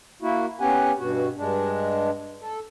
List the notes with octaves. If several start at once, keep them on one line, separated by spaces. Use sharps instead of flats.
A#3 E4 F#4
B3 C#4 G4 F#5 G#5
G2 B2 F#4
G2 G#3 D4
A4